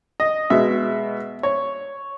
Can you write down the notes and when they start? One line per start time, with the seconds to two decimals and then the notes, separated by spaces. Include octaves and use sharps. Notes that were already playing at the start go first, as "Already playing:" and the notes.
0.20 D#5
0.50 B2 G#3 E5
1.43 C#5